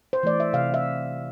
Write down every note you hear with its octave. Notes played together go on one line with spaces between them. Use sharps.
C5
E3 A3 D5
E5
C3 F5
E5